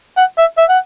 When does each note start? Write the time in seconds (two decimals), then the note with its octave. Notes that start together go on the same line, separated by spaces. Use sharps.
0.17 F#5
0.38 E5
0.58 E5
0.69 F#5